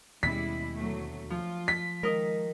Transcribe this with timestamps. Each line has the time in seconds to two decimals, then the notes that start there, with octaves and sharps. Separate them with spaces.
0.23 D#2 B2 G3 G#3 C#4 E4 B6
0.76 D2 F#3 A3
1.30 F3 F4
1.68 B6
2.03 D#3 G#3 A#4 D#5